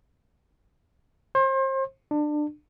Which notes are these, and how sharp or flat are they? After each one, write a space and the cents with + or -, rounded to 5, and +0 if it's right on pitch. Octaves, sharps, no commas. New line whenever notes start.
C5 +35
D4 +25